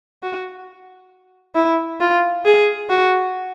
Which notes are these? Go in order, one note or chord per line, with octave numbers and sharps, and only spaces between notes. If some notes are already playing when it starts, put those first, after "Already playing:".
F#4
E4
F4
G#4
F#4